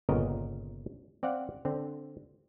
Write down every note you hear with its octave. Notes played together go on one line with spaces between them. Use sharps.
G1 A#2 C#3 B3 A#4 D#5
C4 D5 F5 F#5
D3 C4